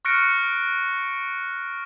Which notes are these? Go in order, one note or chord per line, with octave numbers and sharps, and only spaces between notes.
C#6 F6 F#6 A#6 C#7 D7